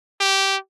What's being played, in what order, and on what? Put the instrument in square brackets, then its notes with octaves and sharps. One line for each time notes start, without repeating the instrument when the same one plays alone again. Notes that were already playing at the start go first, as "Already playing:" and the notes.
[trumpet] G4